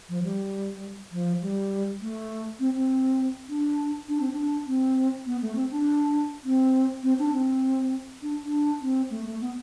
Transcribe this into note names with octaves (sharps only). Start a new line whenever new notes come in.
F3
G3
F3
G3
A3
C4
C4
D4
D4
C4
D4
C4
B3
A3
C4
D4
C4
C4
D4
C4
D4
D4
C4
A3
A3
B3